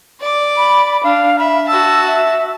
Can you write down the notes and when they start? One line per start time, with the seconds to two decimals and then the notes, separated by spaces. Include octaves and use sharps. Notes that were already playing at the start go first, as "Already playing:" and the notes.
0.20 D5 D6
0.57 B5
1.03 D4 F5
1.39 E5 B5
1.68 F#4 A5 E6
2.07 E5